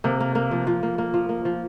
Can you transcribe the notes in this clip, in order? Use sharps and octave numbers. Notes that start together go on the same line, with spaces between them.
C3 A#3
A#3
A#3
F3
F3
A#3
A#3
F3
A#3
F3